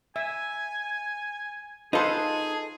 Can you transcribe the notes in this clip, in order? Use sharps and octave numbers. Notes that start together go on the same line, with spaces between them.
E5 G#5
D#4 F4 G#4 A4 B4 C5